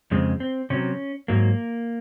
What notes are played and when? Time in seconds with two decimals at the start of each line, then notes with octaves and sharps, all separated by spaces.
0.11 F2 C#3 G#3 C4
0.40 C4
0.70 C3 F#3 C#4
1.28 G#2 F#3 A#3